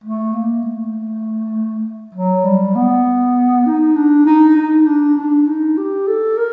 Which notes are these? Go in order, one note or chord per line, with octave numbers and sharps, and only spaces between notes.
A3
A#3
A3
F#3
G3
B3
D#4
D4
D#4
D#4
D4
D4
D#4
G4
A4
A#4